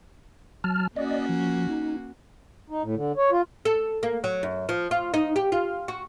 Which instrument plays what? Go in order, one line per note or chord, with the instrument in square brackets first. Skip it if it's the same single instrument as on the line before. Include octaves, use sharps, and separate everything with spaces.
[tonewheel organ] F#3 A5 F6
[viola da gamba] A#3 C#4 F#4 [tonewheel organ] D5 D#5
[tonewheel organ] F3
D#4
[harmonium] D#4
A2
D3
C#5
F4
[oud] A4
A#3
F#3
F#2
F3
F4
D#4
G4
F4
F#4